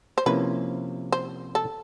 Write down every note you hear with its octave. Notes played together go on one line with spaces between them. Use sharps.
C5
C3 F3 A#3 C#4 E4 B4
C5
A4